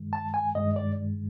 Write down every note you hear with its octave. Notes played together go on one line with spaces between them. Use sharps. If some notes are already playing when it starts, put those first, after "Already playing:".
Already playing: G2 D#3 G#3
A5
G#5
G2 D#3 G#3 D#5
D5